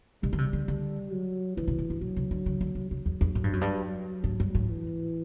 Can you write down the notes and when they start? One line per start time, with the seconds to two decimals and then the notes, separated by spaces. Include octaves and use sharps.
0.23 B2 G3
0.33 D3
0.38 C3
0.53 D3
0.68 D3
1.12 F#3
1.57 D3 E3
1.68 C3
1.79 B2
1.90 A2
2.01 B2 F#3
2.16 C3
2.31 D3
2.46 D3
2.61 D3
2.75 C3
2.91 C3 F#3
3.06 E2
3.21 E2
3.35 A2
3.44 G2
3.53 F#2
3.61 G2
4.24 A2
4.40 G2
4.55 A2
4.69 E3